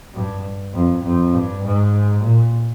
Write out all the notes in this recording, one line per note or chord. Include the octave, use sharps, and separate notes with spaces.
G2
F2
F2
G2
G#2
A#2